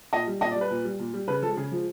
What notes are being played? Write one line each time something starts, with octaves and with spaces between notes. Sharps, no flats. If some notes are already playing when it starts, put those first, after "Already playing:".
A#2 D#5
G3
A#2 D#5
D5
G3
B4
A#2
G3
A#2
G3
C#3 B4
F3 G#3 A4
C#3 G#4
F3 G#3